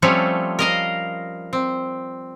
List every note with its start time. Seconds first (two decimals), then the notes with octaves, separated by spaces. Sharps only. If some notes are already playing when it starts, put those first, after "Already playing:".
0.02 F3 G3 A3 C4 C#4
0.59 A#4 D#5 F5
1.53 C4